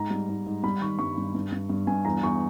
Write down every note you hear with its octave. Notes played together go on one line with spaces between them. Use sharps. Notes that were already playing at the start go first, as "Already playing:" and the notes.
Already playing: G#2 A#5
G3
G#2
G#2
G3 B5
D#3 C#6
G2 C#6
G2
G2
G2
G2
G2 G#5
E2 A#5
E2 C#6